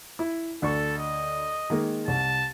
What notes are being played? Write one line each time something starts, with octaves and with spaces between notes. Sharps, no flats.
E4
D2 A4 C#6
D#5
D#3 G#3 A#3
C2 A5